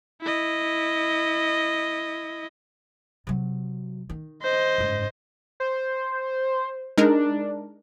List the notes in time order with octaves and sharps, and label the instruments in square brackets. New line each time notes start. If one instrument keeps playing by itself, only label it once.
[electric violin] E4 D#5
[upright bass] C3 F#3
D#3
[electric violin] C5 D#5
[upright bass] F#1 G#2
[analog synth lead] C5
[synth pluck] G#3 D#4 A#4 [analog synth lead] D4